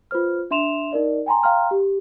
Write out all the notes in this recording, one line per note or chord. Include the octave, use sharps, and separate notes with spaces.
F4 B4 C5 F6
D4 E5 C6 E7 F7
D#4 A#4 D5 D#5
G5 G#5 A#5 C6
F5 G5 A#5 C6 F6
G4